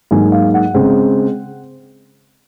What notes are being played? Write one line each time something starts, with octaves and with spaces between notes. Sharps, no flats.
G#2 F#3 A#3 G#5
F5
F#5
C#3 G#3 C4